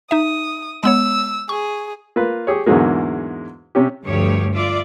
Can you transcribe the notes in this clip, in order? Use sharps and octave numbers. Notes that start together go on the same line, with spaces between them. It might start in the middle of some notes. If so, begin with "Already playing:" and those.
D#4 E5 D#6
G#3 B3 C#5 E6
G#4 C#6
A#3 F4 B4
G4 G#4 C#5
E2 G#2 D3 F#3 G#3 A#3
C3 C#4 G4
D2 G2 F3 A3 G4 C#5
F4 D5 E5